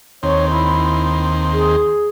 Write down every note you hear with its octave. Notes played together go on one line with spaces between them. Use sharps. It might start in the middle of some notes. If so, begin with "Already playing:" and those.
D#2 C4 C#5
E4
G#4